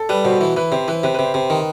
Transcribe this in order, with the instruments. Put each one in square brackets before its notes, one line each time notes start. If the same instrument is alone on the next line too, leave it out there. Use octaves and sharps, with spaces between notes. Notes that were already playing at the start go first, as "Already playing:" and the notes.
Already playing: [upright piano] A4
[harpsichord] G3 [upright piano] B4
[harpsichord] B2 [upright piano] C5
[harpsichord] E3
[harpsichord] E3 [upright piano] B4
[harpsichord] C3 [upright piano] C5
[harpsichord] E3 [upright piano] B4
[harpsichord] C3 [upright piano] B4
[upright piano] B4
[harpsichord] C3
[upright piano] C5
[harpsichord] C3
D#3